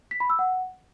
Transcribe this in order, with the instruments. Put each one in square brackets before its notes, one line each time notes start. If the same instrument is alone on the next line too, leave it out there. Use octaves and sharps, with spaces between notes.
[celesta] B6
B5
E6
F#5